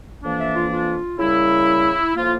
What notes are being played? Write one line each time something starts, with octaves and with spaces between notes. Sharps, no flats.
F2 E3 A#3 D4
E5
F4
F4
C#3 G3 A#3 E4
A2 F3 A#3 F4